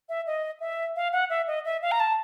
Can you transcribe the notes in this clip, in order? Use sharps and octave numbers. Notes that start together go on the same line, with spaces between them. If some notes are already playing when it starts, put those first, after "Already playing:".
E5
D#5
E5
F5
F#5
E5
D#5
E5
F5
A#5
A5